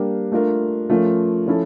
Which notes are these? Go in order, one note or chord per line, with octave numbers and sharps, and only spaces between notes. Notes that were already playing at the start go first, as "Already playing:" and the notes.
Already playing: G3 A#3 D4 G4 A#4
A3 D4 F4 A#4
F3 A3 C#4 F4 A#4
F3 C#4 E4 A4